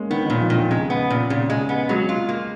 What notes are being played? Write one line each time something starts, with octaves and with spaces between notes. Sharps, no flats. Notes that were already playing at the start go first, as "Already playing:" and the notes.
Already playing: G#3 A#3 C#4
D#3 B3
A#2 D#3
F3
A#2
D#3
C#3 G#3
B3
A#2
A#2 C#3
G#3
B3
F#3 G#3
F4
A#3